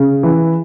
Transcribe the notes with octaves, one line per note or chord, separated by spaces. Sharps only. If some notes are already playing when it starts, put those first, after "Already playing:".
Already playing: C#3
E3